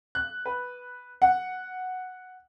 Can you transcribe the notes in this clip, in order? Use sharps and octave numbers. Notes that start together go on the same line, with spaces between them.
F#6
B4
F#5